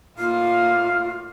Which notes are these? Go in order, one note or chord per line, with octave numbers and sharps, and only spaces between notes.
A2 A#3 D#4 F4 F5